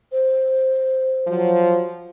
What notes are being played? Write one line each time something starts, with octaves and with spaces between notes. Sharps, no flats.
C5
F3 F#3